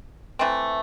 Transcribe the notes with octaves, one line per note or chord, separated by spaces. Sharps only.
E3 A3 C4